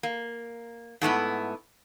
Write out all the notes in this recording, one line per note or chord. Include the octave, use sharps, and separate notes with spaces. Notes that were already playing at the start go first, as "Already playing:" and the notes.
A#3
G#2 A3 B3 E4